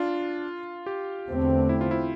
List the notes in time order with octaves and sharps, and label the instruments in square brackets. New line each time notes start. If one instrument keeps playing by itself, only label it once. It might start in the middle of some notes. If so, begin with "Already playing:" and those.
Already playing: [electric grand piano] D4 F4
G4
[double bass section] E2 D3 A3 C4
[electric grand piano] E4
F4
E4